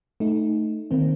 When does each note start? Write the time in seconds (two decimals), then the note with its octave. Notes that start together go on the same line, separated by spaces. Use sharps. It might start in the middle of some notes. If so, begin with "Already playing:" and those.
0.20 A3 D#4
0.91 D#3 A#3 C4